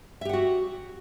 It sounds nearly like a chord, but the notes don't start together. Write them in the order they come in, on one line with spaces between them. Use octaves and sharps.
E5 G4 F#5 F#4